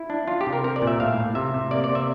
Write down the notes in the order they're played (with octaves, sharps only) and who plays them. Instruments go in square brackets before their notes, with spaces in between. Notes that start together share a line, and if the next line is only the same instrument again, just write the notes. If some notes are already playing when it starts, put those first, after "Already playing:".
Already playing: [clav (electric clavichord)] E4
D4
D4 F4
G4
C3
A#4
C4 A#4
D5
A#2
E5
A2 F5
A2
C3 E5
C3
A#3 D5
D5
C3
E5